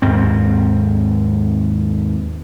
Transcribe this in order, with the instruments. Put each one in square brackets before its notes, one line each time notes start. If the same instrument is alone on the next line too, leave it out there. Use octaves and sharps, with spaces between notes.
[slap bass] D#2 G#2 C4